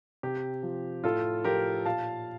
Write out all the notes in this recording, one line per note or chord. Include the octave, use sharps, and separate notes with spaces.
C3 G4
F3
A2 F4 A4
F3 G4 A#4
A#2 F5 A5